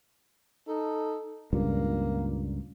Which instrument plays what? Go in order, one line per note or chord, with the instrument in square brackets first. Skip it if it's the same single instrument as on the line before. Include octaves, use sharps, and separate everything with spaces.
[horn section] D#4 A4
[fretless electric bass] C#2 G2 A#2 [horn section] A#3